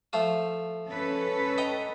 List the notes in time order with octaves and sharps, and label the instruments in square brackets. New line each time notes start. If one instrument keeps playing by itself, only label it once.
[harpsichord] F3 A3 F4
[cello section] C#4 A4 B4
[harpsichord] D#5 G5 A#5